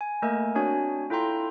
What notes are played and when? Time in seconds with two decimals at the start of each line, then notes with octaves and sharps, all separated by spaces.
0.01 G#5
0.22 A3 A#3 A#4 D#5 G#5
0.55 C4 D4 F#4 C#5 G#5
1.10 E4 F4 A4 G5 A#5 C6